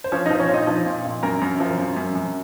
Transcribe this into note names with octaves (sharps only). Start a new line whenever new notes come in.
C5
F3 C#4 C#5
D#4 D#5
F3 C5
C#4 C#5
A#2 D#4 D#5
F3
A#2
A#2
F#2 A#4 A#5
F#2
F3
F#2
F#2
F#2